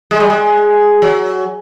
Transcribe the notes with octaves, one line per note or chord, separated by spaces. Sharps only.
G#3
G3
G#3
F#3